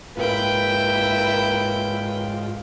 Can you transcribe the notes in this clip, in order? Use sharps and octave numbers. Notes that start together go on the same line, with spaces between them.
G#2 A#3 E4 F4 B4 G5